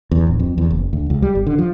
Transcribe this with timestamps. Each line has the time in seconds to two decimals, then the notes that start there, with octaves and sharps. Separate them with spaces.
0.11 E2
0.27 D1
0.39 F2
0.58 E2
0.71 F#1
0.93 D2
1.10 C#2
1.22 G3
1.35 G1
1.47 D3
1.58 F3